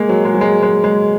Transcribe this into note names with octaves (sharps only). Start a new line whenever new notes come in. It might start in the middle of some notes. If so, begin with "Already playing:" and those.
Already playing: G#3 A#3
F#3
G#3
F#3
G#3
G#3
G#3